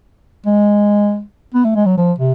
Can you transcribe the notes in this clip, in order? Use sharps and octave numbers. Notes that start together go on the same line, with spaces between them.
G#3
B3
A3
G#3
F#3
F3
C3